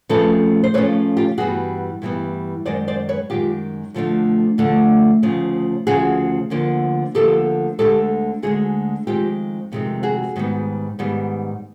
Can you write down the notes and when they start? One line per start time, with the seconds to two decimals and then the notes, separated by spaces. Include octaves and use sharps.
0.09 F2 C#3 F3 A3 C#4 A4 B4
0.64 C5
0.74 F2 C#3 F3 A3 C#4 B4 C#5
1.17 F4 G4
1.37 G2 E3 G3 B3 F#4 G#4
2.02 G2 E3 G3 B3
2.65 F#2 D#3 G#3 C5 D5
2.88 C5 D5
3.09 B4 C#5
3.30 F#2 D#3 G#3 F4 G4
3.94 D2 D3 F3 A3 D4
4.58 D2 D3 F3 A3 D4
5.23 D2 C#3 F3
5.87 D2 C#3 F3 F#4 G#4
6.50 D2 D3 F3 A#3
7.15 D2 D3 F3 A#3 G4 A4
7.79 D2 D3 F3 G#3 G4 A4
8.43 D2 D3 F3 G#3 F#4 G#4
9.07 F2 C3 D#3 G#3 C4 F4 G4
9.72 F2 C3 D#3 G#3 C4
10.03 F#4 G#4
10.36 G#2 D#3 G3 B3
10.99 G#2 D#3 G3 B3